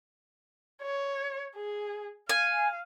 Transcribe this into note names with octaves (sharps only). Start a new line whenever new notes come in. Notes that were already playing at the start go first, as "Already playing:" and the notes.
C#5
G#4
F5 G#5